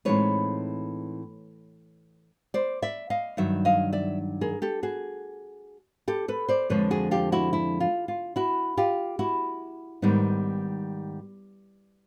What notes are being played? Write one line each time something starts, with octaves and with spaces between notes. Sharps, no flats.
A2 E3 G#3 C4 D#4 B4 C#5
C5 D5
D5 E5
D#5 F5
G2 D#3 F#3 E5
D#5 F5
D5 E5
G#4 A#4
G4 A4
F#4 G#4
G4 A4
A4 B4
C5 D5
F2 D3 F3 G#3 B4 C#5
F#4 G#4
F4 G4
E4 F#4
E4
F4
F4
E4 F#4
F4 G4
E4 F#4
G#2 D#3 G3 B3 D#4